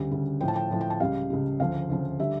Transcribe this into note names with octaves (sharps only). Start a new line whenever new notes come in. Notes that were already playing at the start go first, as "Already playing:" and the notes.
Already playing: D2 C#3 G3
D2 C#3 G3
A2 F3 G5
A5
G5
A2 F3
G5
A5
C#2 C#3 G3 F5
C#2 C#3 G3
D2 C#3 F3 F5
D2 C#3 F3
D3 G3 E5